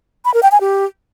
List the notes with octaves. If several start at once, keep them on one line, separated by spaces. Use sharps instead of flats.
B5
A#4
G5
G#5
G4